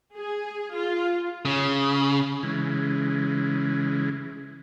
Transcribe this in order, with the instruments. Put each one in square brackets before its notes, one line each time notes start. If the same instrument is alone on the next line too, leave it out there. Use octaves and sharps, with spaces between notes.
[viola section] G#4
F4
[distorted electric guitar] C#3
[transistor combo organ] C#3 E3 G#3